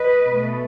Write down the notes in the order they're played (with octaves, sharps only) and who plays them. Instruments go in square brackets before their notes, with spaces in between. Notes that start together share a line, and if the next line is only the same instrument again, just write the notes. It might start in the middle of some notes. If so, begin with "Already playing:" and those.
Already playing: [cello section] B4 D#5
B2 A3